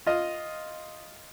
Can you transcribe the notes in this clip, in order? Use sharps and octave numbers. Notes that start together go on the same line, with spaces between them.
F4 D#5